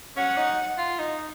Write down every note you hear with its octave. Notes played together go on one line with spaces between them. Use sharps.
C#4 F#5
D#4
F4
D#4